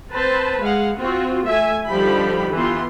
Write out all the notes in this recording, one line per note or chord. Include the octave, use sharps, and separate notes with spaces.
C4 B4 C5 A5
G#3 F5 F#5
C4 F4 F#4
A3 E5 G#5
D3 F3 G3 D#4 G4 B5
E3 B3 F4 G4 C6